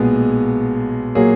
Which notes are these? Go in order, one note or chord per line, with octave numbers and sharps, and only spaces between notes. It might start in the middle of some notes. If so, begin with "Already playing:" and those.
Already playing: B1 A#2 G#3 B3 G#4
A#2 F#3 A#3 G#4